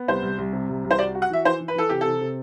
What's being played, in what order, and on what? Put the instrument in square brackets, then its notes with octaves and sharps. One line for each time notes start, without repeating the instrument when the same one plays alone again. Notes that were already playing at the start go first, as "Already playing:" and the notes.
Already playing: [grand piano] B3
[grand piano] C2 [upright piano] C5
[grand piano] C2
C2
C3
C2
C2
[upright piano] C5
[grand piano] F#4 [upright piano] D5
[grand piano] F#4
[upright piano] F#5
[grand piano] E3 [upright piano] E5
[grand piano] E3 [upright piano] C5
[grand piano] E3
[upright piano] B4
[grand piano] E3 [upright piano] A4
[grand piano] C3 [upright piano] G4
[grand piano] C3 [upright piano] A4
[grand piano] C3